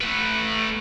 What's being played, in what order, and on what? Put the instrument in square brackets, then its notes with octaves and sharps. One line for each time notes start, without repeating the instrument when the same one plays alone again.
[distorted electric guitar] A3 B4